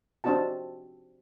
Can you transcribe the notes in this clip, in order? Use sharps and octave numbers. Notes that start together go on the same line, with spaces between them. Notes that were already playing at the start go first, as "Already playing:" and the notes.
C4 D4 D#4 F#4 A5